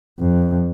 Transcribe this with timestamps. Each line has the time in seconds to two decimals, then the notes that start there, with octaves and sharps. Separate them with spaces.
0.20 F2